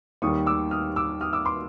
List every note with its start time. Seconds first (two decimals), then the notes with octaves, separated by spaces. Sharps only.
0.22 D#2 D#3 G3 C#6 D#6
0.46 D6 E6
0.71 D#6 F6
0.96 D6 E6
1.21 D#6 F6
1.33 D6 E6
1.45 C6 D6